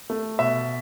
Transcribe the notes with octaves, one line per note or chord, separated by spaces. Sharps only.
A3
B2 E5